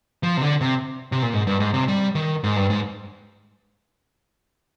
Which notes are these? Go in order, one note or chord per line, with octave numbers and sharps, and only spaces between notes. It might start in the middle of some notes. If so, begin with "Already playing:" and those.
F3
C3
D3
C3
C3
A#2
G#2
G2
G#2
C3
G3
D#3
G#2
G2
G#2